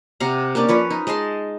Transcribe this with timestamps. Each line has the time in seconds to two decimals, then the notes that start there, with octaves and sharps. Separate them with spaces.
0.20 C3 F5 F#5 A#5
0.55 A#3 C#4 D4 D5
0.69 F3 B4 C#5
0.90 D#4
1.07 G#3 D#5 A5 C6